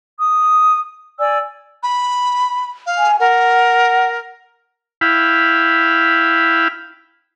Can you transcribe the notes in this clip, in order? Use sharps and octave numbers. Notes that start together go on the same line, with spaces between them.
D#6
D5 G#5 E6
B5
F5
G#5
A#4 F#5
E4 F5 G5 B5